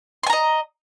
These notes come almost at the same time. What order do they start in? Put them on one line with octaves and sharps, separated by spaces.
C6 G#5 A#5 D#5